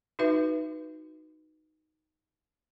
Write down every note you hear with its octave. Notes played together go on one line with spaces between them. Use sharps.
D#4 F#4 B4 E5